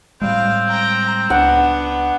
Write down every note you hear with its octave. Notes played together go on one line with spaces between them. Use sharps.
A2 G3 G#3 C4 F5
G5 A#5
C#2 B3 D4 F#5